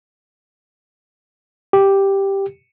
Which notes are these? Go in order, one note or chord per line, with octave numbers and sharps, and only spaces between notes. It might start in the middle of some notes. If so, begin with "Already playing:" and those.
G4